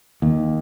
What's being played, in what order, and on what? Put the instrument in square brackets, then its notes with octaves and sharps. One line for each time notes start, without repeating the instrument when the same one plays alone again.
[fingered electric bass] D#2